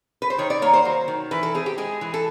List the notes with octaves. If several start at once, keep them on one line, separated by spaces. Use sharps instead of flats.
B4
C5
D#3 C#5
D5
A#3 C#5
C5
F#3
D#3
E3 B4
A4
C4 G#4
G4
G#3 G#4
E3
A4